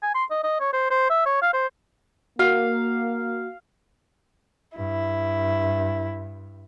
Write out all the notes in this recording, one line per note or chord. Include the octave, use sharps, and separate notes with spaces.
G#5
C6
D#5
D#5
C#5
C5
C5
E5
C#5
F5
C5
A#3 F#4 F5
G2 E4